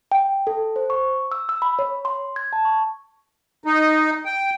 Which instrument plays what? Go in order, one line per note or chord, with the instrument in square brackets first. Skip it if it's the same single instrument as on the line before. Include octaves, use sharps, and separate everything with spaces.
[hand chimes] G5
A4
C5
C#6
E6
E6
B5
C#5
C6
G#6
A5
C#6
[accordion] D#4
G5